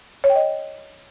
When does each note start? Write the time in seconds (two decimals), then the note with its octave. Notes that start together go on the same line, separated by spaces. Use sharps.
0.24 C#5
0.30 G5
0.35 D#5